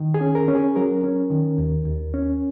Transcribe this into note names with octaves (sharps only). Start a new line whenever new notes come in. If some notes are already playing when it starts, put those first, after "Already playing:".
Already playing: D#3
G#4
C#4
A#4
C#4
G#4
F#3 A#4
C#4
D#3
D#2
D#2
C#4